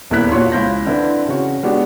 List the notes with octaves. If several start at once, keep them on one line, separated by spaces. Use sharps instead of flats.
D#1 E2 A#3 E4 F#6 B6
A#1 F4 F#4 C#5 F#5 C6
C#2 E4 G6 A#6
D3 C4 D4 E4 B4
C#3 F#4
G#3 B3 D4 F#4 G4